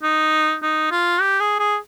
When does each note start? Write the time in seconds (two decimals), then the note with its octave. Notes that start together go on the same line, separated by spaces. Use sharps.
0.03 D#4
0.63 D#4
0.91 F4
1.21 G4
1.40 G#4
1.59 G#4